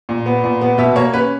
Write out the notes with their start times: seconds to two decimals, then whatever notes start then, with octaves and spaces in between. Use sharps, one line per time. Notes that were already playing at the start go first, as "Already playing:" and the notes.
0.09 A#2
0.26 B3
0.44 A#2
0.61 B3
0.78 B2 E5
0.96 A#3 C#5
1.13 C#4 B4